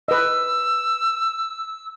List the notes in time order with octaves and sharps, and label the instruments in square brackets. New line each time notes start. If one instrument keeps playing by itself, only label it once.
[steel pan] B4 D#5 [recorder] E6